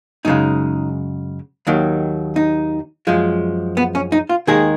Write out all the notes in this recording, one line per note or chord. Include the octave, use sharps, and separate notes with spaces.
F#2 C#3 G#3 D#4
D#2 D#3 F#3
D#4
F#2 F3 G#3
B3
C#4
D#4
F4
D#2 D#3 G#3 G#4